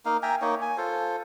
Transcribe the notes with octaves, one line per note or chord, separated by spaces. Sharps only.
A#3 D#4 F5
E5 G5 G#5 A#5
A#3 D#4 C#5
G#5
F4 A4 C5